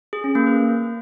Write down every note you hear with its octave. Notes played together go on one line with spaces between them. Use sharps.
G#4
C#4
A#3
B4